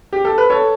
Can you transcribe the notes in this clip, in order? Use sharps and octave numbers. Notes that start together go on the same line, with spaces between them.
G4
A4
B4
A4 C#5